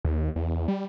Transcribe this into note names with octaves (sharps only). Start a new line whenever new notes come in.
D#2
E2
G3